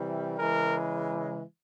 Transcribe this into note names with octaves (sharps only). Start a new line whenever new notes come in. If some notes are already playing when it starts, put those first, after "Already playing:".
Already playing: C3 E3 G3
C#3 E3 G#3 A#4